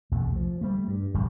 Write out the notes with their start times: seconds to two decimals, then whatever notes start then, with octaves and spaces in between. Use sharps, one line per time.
0.12 B1 E2 C3 A3
0.36 F3
0.61 G3 A3
0.88 G2
1.14 D#1 G#1 F2 G3